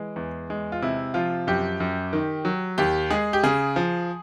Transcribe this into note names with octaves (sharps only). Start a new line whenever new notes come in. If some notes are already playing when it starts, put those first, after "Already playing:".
Already playing: E3 G#3
E2
G#3
F4
C3 E4
F3 F4
F#2 G4
F#2
D#3
F#3
D#2 G4
G#3 G#4
G4
C#3 G#4
F3